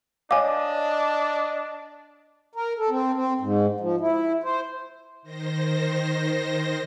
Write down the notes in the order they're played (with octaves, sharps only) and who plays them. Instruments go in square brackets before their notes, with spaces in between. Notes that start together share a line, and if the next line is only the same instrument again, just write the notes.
[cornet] D4 [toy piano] C#5 F5 [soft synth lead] D#5 [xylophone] G#5 D6
[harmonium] A#4
A4
C4
C4
G#2
F3
E4
C5
[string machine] D#3 C5 A#6